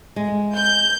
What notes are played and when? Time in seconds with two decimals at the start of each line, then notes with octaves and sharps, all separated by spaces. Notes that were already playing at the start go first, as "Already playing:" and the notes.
0.16 G#3
0.55 G6